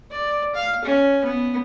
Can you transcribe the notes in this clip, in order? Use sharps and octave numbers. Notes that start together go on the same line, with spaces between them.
D5
F5
C#4
B3